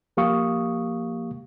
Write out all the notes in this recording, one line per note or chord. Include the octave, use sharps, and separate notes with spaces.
F3 A#3 G4 F5 C#6 D#6